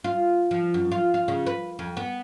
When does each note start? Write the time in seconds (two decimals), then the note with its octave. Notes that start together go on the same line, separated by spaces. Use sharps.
0.04 F4
0.51 F3
0.74 F#2
0.92 F4
1.14 F4
1.28 C#3
1.47 B4
1.79 F2
1.97 B3